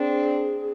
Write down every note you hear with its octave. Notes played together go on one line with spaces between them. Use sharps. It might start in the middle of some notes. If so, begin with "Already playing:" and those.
Already playing: C4 D4 G#4